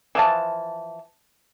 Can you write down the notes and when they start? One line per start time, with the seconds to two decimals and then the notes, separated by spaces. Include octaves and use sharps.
0.15 E3 F3 A5